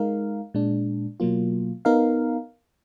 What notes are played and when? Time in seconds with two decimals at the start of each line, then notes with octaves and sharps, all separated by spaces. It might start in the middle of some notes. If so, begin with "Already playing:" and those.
Already playing: G#3 D#4 A#4 F5
0.54 A#2 G#3 D4
1.20 B2 F#3 A#3 F4
1.85 B3 D#4 A#4 F5